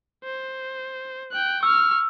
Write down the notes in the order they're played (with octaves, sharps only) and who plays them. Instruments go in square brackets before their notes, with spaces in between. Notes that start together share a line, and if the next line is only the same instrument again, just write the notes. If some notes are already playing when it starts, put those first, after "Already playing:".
[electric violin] C5
G5 F#6
[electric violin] C#6 F6 [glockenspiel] E6